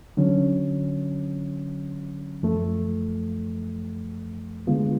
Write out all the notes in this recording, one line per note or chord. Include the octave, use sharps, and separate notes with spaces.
D3 F#3 C#4
F#2 F3 A3
D3 G#3 B3 F4